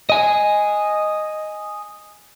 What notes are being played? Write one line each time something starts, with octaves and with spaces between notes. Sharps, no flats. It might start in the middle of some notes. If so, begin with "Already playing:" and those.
D#5 G#5